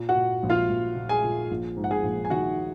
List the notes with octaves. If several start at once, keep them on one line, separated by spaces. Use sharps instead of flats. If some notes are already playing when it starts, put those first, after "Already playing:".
Already playing: A#2
F#4 F#5
A#2
A#1
F4 F5
A#1
A#2
G#4 G#5
A#2
A#1
G#2
F#5
G#4 G#5
A#1
G#5
D#3 F#4 F#5